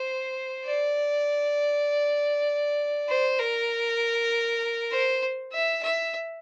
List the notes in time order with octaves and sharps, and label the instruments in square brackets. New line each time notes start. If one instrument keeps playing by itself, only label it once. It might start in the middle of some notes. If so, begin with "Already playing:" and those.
Already playing: [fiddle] C5
D5
C5
A#4
C5
E5
E5